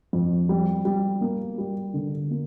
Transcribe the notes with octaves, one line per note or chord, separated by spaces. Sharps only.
F2
G3
G3
A#3
G3
D3
A#3